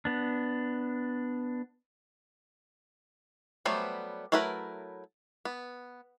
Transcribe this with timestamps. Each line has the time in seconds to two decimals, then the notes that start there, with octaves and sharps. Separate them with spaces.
0.05 B3 D4
3.65 F#3 G3 A3 B3 C5
4.32 F#3 A3 E4 A#4 B4
5.45 B3